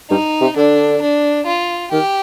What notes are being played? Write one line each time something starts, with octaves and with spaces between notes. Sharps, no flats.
G2 D#4
C3
D3 D4
D4
F4
D#3 G4